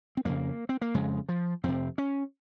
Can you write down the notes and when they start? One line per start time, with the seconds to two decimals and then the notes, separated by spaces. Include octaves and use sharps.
0.17 C4
0.25 F2 C#3 A#3
0.69 C4
0.81 A#3
0.94 F2 C#3 G#3
1.29 F3
1.64 F2 C3 C4
1.98 C#4